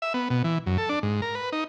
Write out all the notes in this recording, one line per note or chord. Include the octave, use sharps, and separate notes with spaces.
E5
B3
B2
E3
F#2
A4
D4
G#2
A#4
B4
D#4